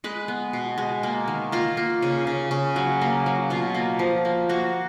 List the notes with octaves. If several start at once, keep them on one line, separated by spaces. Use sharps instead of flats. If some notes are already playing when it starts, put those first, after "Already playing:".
G#3 B4
B3
B2
G#3
A#3
D#3
A#3 F4
A#3
C#3
C#3
C#3
F#3
A#3
F#3
B2 F4
A#3
F3
A#3
A#3 F#4